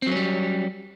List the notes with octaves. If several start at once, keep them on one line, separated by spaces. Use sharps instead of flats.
F#3 G3 C4 C#4